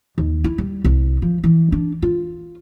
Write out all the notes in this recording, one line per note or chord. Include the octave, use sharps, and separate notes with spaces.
D#2
E4
G3
C2
F3
E3
D4
F4